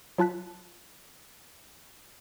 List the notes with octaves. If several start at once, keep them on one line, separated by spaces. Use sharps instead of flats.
F#3 F4 A5 F#6 B6